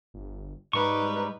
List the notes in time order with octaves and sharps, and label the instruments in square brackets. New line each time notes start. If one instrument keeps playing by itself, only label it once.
[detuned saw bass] G1
[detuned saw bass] G#2 [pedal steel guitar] G3 C#6 [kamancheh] D#4 B4